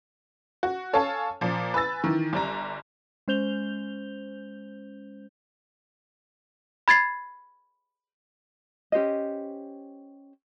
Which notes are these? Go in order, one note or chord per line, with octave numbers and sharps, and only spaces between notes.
F#4
A4 C#5 F5 G#5 A5
A#2 F3
B4 G#5 E6 A6
D#3 E3
G1 G3 A#5
G#3 C#4 C5 G6 F7 G7
B5 G#6 A6 C7
C#4 G4 C5 D#5